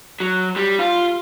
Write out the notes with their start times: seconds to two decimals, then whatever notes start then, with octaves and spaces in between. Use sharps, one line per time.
0.20 F#3
0.56 G3
0.79 F4